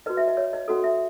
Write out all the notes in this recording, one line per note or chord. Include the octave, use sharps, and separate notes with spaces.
F#4 B4 D#5
E5
D#5
C#5
D#5
C#4 F#4 A4 D#5
E5